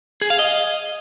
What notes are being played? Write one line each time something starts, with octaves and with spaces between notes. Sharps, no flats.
G#4
F5
D#5